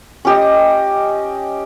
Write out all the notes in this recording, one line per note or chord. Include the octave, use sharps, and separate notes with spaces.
C#4 G4 D#5